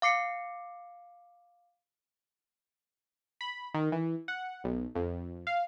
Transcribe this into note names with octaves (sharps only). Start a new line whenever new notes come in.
F5 D6 C7 C#7
B5
D#3
E3
F#5
B1
F2
F5